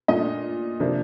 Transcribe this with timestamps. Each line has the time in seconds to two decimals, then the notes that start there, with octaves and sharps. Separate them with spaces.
0.08 A#2 A3 D4 D#5
0.80 C3 F3 A#3 D4